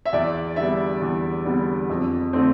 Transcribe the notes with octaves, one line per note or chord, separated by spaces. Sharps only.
E5
E2 D5
D3 G3 B3 E5
E2
D3 G3 B3
F2
D3 A3 C4